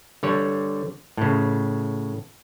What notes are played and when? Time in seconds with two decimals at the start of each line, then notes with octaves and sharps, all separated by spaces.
0.23 D3 G3 C#5
1.17 A2 C#3